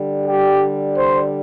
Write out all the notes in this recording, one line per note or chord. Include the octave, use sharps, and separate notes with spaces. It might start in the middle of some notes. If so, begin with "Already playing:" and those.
Already playing: D3 G3
G4
C5